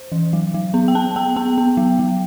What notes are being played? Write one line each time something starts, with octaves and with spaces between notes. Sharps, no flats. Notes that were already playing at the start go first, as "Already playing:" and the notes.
Already playing: C5
E3
F#3
F#3
B3
G5
B3 A5
B3 G5
B3 G5
B3
F#3
F#3